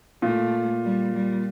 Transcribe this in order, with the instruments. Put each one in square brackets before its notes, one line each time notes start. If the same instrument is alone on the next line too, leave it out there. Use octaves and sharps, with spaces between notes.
[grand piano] A#2 [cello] A3
[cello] G3
G3